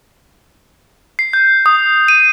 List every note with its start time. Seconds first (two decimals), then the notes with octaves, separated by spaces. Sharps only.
1.19 C7
1.33 G6
1.66 D#6
2.08 D#7